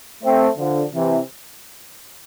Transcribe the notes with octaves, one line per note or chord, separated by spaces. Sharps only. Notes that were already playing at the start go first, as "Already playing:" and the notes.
A3 C4
D3 F3
C3 E3